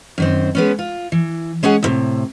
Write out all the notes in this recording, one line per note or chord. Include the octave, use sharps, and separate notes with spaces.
F#2 D#3 C4
G#3 B3 C#4
F4
E3
G#3 C#4 G#4 F#5
E2 A2 C3